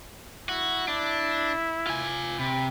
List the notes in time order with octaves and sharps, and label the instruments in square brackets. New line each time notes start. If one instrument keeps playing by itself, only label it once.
[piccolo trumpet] E4 [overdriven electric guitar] F#4
[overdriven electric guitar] D4 [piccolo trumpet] E4
[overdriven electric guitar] F4 G#5
[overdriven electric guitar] C3 [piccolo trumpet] B5